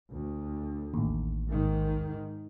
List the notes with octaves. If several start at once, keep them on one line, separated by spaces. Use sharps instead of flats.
D2
A1 D#2
G#2 D#3